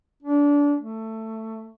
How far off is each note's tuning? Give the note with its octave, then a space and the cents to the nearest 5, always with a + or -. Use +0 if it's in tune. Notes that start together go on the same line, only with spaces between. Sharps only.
D4 -25
A3 +15